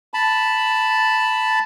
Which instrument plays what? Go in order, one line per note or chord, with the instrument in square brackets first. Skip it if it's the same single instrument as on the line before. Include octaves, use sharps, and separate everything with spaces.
[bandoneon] A5 B5